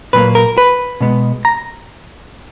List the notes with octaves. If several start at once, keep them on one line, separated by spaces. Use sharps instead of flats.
A#2 F#3 A#3 B4
A#4
B4
B2 G#3 B3
A#5